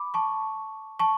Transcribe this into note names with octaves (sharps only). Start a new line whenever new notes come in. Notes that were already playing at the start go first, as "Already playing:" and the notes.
Already playing: B5 D6
A5 C#6
A5 C#6